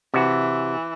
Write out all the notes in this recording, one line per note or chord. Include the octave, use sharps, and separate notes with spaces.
C3 E3 F#4